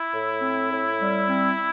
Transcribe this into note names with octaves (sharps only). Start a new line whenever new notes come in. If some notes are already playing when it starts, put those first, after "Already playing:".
Already playing: E4
A2
C4
A2
G3
C4